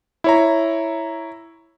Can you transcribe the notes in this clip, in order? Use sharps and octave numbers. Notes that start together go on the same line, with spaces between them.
E4 C#5 A#5